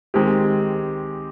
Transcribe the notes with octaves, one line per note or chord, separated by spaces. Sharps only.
D#3 G#3 C4 G4